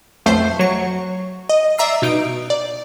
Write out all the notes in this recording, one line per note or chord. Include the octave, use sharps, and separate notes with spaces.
B1 F2 A3 C5 C7
F#3 C#6
D#5
D5 E5 A#5 E6 C7
B2 D#4 D7
D5